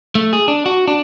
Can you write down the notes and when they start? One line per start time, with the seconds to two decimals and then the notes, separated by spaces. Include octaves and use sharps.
0.15 A3
0.33 G#4
0.48 D4
0.66 F#4
0.88 D4